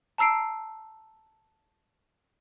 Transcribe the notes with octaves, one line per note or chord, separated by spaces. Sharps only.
A5 A#5 E6 C7 D7